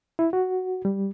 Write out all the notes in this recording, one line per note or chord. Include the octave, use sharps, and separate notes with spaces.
E4
F#4
G3